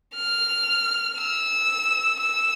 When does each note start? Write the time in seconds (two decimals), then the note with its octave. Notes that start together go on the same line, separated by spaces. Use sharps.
0.15 F6
1.17 E6
2.20 E6